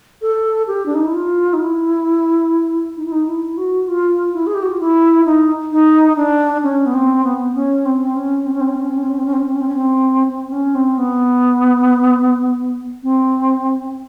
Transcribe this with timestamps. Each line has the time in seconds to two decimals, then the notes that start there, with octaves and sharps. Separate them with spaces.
0.22 A4
0.67 G4
0.86 D4
0.95 D#4
1.05 E4
1.14 F4
1.53 D#4
1.60 E4
2.97 D#4
3.05 E4
3.12 D#4
3.27 E4
3.57 F#4
3.88 F4
4.34 E4
4.47 G#4
4.54 G4
4.63 F#4
4.71 F4
4.80 E4
5.26 D#4
5.72 D#4
6.17 D4
6.63 C#4
6.86 B3
6.94 C4
7.24 B3
7.55 C#4
7.85 C4
8.16 C#4
8.46 C4
8.53 C#4
8.61 C4
8.68 C#4
8.75 C4
8.82 C#4
8.89 C4
8.96 C#4
9.03 C4
9.10 C#4
9.18 C4
9.26 C#4
9.33 C4
9.40 C#4
9.47 C4
9.54 C#4
9.61 C4
9.69 C#4
9.75 C4
10.29 C4
10.48 C4
10.52 C#4
10.75 C4
10.98 B3
13.03 C4